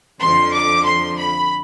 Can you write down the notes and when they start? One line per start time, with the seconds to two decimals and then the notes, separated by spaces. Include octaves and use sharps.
0.20 F2 D3 F3 C6
0.53 D6
0.85 C6
1.18 B5